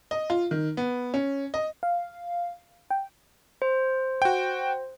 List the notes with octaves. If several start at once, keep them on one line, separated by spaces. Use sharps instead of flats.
D#5
F4
D#3
B3
C#4
D#5
F5
G5
C5
F#4 G5